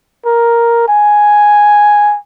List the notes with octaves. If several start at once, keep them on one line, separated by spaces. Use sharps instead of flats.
A#4
G#5